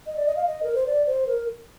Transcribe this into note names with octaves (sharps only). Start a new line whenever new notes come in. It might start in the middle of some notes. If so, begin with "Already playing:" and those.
D#5
D5
D#5
F5
D#5
A#4
C5
D5
C5
A#4